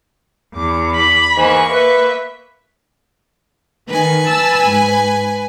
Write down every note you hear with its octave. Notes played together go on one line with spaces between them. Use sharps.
E2 D6
B5
G#2 E3 A#3 C#6
B4 E5
D#3 B4 G#5
A5 E6
G#2